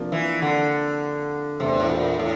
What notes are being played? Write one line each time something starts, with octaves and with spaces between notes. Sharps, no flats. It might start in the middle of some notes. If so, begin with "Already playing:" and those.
Already playing: C3 F3 A#3 D4
E3
D3
E2 C3 E3 A3 D4
A2
A#2
A2